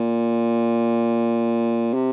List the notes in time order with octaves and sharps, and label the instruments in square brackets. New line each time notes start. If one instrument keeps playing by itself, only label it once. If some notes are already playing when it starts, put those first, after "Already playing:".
Already playing: [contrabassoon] A#2
C3